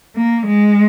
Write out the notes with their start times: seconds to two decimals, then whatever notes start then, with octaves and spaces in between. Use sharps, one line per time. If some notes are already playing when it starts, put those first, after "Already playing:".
0.16 A#3
0.46 G#3